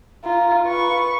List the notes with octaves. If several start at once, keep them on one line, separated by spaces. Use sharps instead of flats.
F4 A#5
B4 C#6